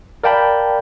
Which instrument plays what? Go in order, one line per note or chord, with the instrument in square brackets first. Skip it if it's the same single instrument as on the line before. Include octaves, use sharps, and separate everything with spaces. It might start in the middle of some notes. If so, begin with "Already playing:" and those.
[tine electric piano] A#4 D5 F5 G5 A5 B5